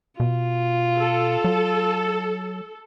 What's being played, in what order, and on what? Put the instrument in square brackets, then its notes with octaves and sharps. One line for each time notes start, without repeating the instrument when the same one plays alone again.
[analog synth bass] B2 [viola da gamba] F4
[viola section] A4
[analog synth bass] F#3